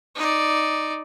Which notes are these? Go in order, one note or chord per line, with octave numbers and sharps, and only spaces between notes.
D#4 D5